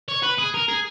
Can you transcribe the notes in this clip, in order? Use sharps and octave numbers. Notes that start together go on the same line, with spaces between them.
C#5
B4
G#4
A#4
G#4